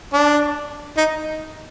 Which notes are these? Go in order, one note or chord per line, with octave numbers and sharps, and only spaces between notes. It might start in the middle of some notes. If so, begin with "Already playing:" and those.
D4
D#4